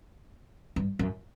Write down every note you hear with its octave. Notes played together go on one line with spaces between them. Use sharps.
G2
F#2